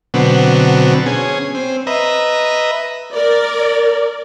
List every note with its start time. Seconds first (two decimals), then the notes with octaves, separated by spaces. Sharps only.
0.14 B2 D3 F#3 B3 C4
1.06 C#4 G#4
1.55 C4
1.87 B4 D#5 E5 A#5
3.13 A#4 D5